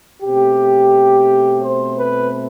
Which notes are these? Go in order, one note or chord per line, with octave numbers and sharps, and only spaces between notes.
B2 A3 C4 G4
C5
B4